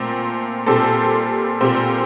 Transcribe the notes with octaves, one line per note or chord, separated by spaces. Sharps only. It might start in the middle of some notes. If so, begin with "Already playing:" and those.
Already playing: A#2 A3 C4
A#2 G3 C4 A4
A#2 G3 C4